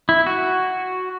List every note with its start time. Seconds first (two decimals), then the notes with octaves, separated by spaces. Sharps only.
0.09 E4
0.26 F#4